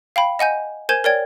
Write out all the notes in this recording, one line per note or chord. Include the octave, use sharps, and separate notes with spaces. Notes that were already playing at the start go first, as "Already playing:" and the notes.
F5 G5 B5
D#5 F#5 G#5 G6
A#4 C5 G#5 G6 G#6 E7
A#4 C#5 D5 G5 G#6